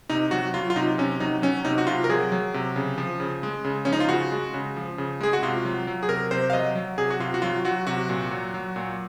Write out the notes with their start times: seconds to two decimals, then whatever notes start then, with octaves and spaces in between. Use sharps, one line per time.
0.10 C3 D#4
0.31 F#3 F#4
0.54 F#3 F4
0.70 F4
0.76 C3 D#4
0.98 C3 C#4
1.20 F#3 D#4
1.42 F#3 C#4
1.65 C3 D#4
1.78 F#4
1.87 C3 F4
2.04 A#4
2.09 F#3 G#4
2.32 F#3
2.54 C3
2.76 C#3
2.98 F3
3.20 C#3
3.43 G#3
3.65 C#3
3.85 F3 C#4
3.93 D#4
4.00 F4
4.09 C#3 F#4
4.32 G#3
4.54 C#3
4.76 F3
4.98 C#3
5.21 G#3 G#4
5.33 F#4
5.43 C3 F4
5.65 F#3
5.87 F#3
6.03 G#4
6.09 C3 A#4
6.31 C3 C5
6.50 F5
6.53 F#3 D#5
6.75 F#3
6.98 C3 G#4
7.10 F#4
7.20 C3 F4
7.34 F#4
7.42 F#3 F4
7.65 F#3 F#4
7.87 C3 F#4
8.09 A#2
8.31 F#3
8.54 F#3
8.76 A#2